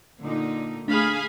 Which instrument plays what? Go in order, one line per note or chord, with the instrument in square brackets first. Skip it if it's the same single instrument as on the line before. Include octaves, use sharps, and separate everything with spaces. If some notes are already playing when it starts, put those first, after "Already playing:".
[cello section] A#2 D3 D#4
[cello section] A3 [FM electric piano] D4 [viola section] G#4 F5 B5